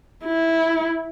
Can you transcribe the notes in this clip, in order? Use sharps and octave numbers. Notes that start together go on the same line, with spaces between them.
E4